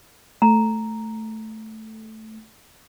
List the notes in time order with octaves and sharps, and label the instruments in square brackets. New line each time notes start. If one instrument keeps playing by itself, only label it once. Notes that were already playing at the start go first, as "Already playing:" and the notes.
[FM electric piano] A3 [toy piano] A#5